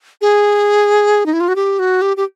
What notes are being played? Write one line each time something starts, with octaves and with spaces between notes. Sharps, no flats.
G#4
D#4
E4
F4
F#4
G4
F#4
G4
G4